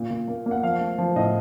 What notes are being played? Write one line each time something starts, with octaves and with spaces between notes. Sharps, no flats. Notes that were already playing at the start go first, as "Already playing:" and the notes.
Already playing: A#2
A#2
A#3
A#3
F#5
F3 F5
A3
F3
A2 D#5